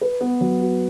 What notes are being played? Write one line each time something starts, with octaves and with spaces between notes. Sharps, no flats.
B4
B3
F#3
F#4